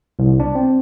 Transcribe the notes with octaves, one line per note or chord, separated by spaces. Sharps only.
C2
D4
C4